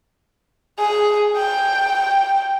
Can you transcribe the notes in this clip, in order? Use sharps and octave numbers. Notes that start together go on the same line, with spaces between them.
G#4
G5